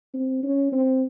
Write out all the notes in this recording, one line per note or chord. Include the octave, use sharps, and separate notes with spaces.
C4
C#4
C4